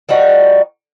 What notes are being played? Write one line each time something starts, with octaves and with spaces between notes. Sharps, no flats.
F3 G3 D#4 F#4